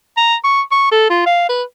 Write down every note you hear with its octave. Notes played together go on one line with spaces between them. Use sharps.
A#5
C#6
C#6
A4
F4
F5
B4